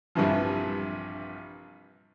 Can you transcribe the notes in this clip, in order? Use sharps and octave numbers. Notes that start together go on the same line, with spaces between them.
A#1 G2 C3 E3 F3